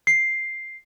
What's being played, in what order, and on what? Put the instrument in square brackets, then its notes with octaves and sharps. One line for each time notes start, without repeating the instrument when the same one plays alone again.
[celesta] C7